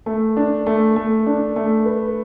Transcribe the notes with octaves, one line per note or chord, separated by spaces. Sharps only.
A3
D4
A3
A3
D4
A3
B4